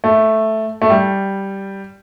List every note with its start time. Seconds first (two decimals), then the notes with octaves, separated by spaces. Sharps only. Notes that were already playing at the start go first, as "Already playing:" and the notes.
0.04 A3
0.82 A3
0.90 G3